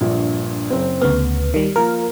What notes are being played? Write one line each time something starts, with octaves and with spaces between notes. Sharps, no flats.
A#1 G2 A#2
F#1 C4
D2 C#3 B3 F6
D#3 G3
F3 A#3 A#4